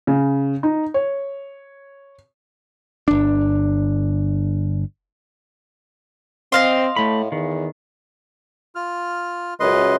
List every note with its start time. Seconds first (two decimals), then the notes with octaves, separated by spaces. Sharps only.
0.07 C#3
0.63 D#4
0.94 C#5
3.08 G1 D4
6.52 C4 D#5 F5 C6
6.96 A2 A3 B5
7.32 E2 D#3
8.75 F4 F6
9.60 C#2 F#2 B4 D#5 C6